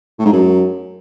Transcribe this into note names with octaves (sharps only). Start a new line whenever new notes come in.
A2
G#2
F#2